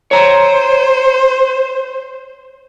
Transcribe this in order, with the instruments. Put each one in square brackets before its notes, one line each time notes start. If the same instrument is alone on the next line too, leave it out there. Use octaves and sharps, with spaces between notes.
[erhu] C5 [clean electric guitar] C#5 A#5